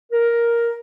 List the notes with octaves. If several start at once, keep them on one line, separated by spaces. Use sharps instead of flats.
A#4